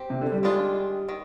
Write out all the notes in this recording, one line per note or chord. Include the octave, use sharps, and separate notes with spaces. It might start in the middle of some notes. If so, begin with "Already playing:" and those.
Already playing: C4 G4
C3
D3
G3
D#3 G#3 D4 F4
D#3